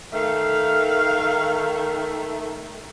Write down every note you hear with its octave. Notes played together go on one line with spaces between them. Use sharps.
D#3 A3 F5